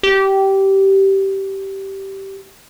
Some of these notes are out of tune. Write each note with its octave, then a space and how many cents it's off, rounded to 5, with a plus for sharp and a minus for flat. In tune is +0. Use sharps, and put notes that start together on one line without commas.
G4 -15